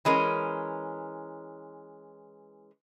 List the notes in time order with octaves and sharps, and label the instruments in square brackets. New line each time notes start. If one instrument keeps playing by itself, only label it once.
[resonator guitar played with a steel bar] E3 G#3 C#4 A#4